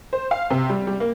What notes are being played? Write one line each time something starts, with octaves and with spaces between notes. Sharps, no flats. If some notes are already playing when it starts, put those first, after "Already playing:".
C5
F5
C3
G3
G3
A#3